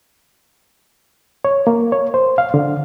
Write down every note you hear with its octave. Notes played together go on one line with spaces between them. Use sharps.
C#5
A#3
C#5
C5
F5
D3